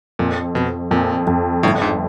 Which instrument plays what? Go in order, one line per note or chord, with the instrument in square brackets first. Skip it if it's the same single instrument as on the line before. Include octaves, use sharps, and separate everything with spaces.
[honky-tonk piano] F2 [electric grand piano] A#2
[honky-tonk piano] F2 [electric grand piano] B2
[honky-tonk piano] F2 [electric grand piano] A#2
[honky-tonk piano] F2
[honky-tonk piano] G1 [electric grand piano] A2
[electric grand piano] G#2